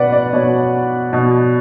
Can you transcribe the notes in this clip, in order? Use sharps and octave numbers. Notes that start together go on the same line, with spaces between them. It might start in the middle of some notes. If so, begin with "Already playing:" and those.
Already playing: B2 B4 D5 F#5
D5
B2 C#5
B2